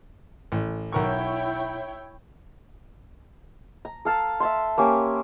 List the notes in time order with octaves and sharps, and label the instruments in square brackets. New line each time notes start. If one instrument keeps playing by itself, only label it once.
[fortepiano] A1
[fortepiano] B1 A#4 C#6 [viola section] E4 C#5 G5
[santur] A#5
A4 F5 A5
E5 A5 C6
A#3 C#4 G4